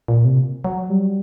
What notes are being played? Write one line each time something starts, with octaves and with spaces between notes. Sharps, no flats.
A#2
C3
F#3
G3